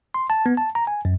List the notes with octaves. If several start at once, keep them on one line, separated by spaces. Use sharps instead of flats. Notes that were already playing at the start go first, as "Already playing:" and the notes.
C6
A5
B3
A5
A#5
G#5
F#2